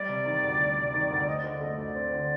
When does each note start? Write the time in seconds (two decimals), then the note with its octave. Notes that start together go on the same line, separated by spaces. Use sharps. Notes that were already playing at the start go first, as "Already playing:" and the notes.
Already playing: G3 D5
0.08 C3
0.25 D#3
0.43 D2
0.59 G3
0.76 C3
0.94 D#3
1.10 D2
1.27 C4 D#5
1.43 D3 D5
1.60 A3 D#5
1.77 D2 D5
1.94 C4
2.11 D3